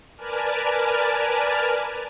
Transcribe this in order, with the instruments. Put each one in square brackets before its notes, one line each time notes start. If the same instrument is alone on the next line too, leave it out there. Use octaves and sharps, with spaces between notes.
[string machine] A#4 B4 D5 G#5 A5 F6